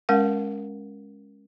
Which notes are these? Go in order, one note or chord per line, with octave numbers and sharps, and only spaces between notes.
G#3 C#4 A#4 F5 F#5